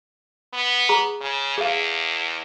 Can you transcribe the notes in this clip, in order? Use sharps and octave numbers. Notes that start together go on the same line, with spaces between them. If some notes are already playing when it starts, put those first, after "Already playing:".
B3
G#4 A#5
C#3
E2 G#4 F5